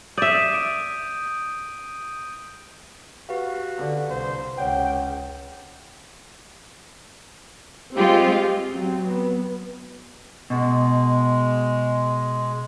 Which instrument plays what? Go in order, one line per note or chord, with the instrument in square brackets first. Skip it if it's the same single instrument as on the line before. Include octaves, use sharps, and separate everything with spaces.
[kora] D5 E5 [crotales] D#6 G6 D#7
[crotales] D#6 D7
[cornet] F#4 [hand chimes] G4 B4 F5
[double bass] D3
[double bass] C2 [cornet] C5
[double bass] C#2 [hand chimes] C#5 F#5 [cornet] G5
[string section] G#3 C4 F4 [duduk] G4
[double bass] F#3 C4
B3
[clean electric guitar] B2 [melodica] G#3